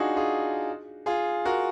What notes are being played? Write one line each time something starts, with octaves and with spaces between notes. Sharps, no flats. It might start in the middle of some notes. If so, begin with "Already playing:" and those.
Already playing: D4 D#4 F4 F#4 G#4
F4 G#4
F4 G#4
F#4 A#4